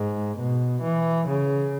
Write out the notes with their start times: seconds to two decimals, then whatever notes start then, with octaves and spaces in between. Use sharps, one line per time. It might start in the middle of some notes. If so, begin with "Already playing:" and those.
Already playing: G#2
0.37 B2
0.81 E3
1.27 C#3